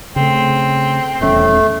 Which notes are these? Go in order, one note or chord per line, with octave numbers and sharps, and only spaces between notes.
C#3 A3 C4
D#1 E2 A3 C#4